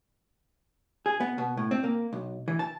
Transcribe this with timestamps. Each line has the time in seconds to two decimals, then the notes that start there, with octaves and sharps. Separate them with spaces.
1.06 G#4
1.20 B3
1.38 B2
1.57 A2
1.71 C4
1.84 A#3
2.13 B1
2.48 E3
2.59 A5